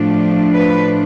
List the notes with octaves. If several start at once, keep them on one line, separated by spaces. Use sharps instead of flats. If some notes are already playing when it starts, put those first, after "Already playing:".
Already playing: A2 F3 A3 D4
B4